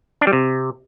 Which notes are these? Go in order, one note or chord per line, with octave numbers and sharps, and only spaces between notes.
D4
G3
C3